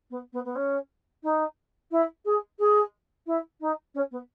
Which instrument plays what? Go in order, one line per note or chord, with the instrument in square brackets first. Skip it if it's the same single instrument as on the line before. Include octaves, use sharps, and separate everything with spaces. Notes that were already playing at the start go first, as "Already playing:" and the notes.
[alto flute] B3
B3
B3
C#4
D#4
E4
G#4
G#4
E4
D#4
C#4
B3